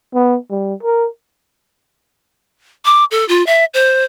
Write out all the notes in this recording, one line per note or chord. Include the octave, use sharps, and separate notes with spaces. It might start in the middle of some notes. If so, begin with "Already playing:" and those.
B3
G3
A#4
D6
A4
F4
E5
C5